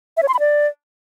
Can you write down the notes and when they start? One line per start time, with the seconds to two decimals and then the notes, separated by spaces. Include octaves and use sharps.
0.17 E5
0.23 C#5
0.28 C6
0.34 B5
0.40 D5